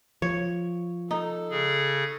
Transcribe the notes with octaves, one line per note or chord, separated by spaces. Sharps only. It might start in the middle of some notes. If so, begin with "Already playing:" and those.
F3 C#5
D#4 A4
C#3 G#4